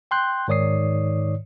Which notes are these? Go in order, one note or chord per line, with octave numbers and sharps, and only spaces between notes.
G5 C6 F#6 G6
G#2 D#3 C#5 D5 D#6 C7